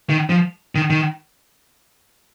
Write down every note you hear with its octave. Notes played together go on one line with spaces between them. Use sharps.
D#3
F3
D#3
D#3